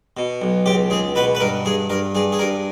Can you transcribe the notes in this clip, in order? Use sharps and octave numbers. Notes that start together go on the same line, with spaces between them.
B2
B1
C#2 G4
C#2 G#4
B2 B4
B4
G2 A#4
G2 G#4
G2 A#4
G2 G#4
G#4
G2 A#4